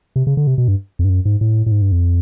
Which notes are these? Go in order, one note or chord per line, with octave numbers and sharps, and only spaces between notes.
C3
C#3
D3
C3
B2
G2
F2
G2
F#2
G#2
A2
A2
G#2
G2
F2